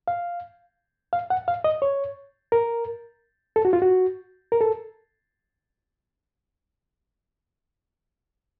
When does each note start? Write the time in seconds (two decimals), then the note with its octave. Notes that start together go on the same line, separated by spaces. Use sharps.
0.08 F5
1.13 F5
1.30 F#5
1.48 F5
1.64 D#5
1.82 C#5
2.52 A#4
3.56 A4
3.65 F#4
3.73 F4
3.82 F#4
4.52 A#4
4.61 A4